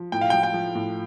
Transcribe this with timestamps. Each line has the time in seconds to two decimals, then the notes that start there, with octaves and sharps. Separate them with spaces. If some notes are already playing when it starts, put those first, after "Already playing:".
Already playing: F3
0.12 A2 G5
0.21 F5
0.30 F3 G5
0.43 G5
0.54 F3
0.75 A2